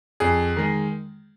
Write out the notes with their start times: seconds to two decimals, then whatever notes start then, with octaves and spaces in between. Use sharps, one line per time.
0.20 F2 G#4
0.56 D#3 G#3